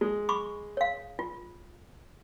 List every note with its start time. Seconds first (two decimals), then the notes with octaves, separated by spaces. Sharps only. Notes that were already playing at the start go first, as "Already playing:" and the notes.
0.01 G#3
0.29 B5 C#6 D6
0.77 C#5 F5
1.19 F4